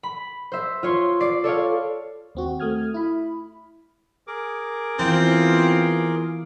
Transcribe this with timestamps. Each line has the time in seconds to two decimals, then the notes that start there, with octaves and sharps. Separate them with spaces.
0.03 B5
0.52 C5 E5
0.83 F4 C#5 C6
1.21 D5 D6 C7
1.44 A4 C#5 D5 F5
2.35 D#2 C4 F#4
2.60 A3 D#6 F6 G#6
2.94 E4 B5
4.27 G#4 A#4 D6
4.99 E3 B3 C4 F4